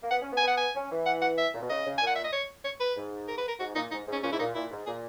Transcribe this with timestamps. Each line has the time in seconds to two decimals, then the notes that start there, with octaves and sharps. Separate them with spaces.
0.02 A#3
0.11 B3 F#5
0.21 C#4
0.32 B3
0.37 G#5
0.43 B3 F#5
0.57 G#5
0.75 C#4
0.91 E3
1.06 F#5
1.22 F#5
1.38 E5
1.54 A#2
1.61 B2
1.70 C#3 D#5
1.85 C#3
1.98 A#2 G#5
2.07 F#5
2.16 E5
2.24 D#5
2.33 C#5
2.65 C#5
2.80 B4
2.96 G#2
3.28 A#4
3.38 B4
3.48 A#4
3.59 G#2 F#4
3.75 A#2 D#4
3.91 G#2 D#4
4.07 G#2
4.13 C#4
4.23 A#2 C#4
4.31 G#2 E4
4.39 A#2 D#4
4.54 A#2 E4
4.71 G#2
4.86 A#2 G#4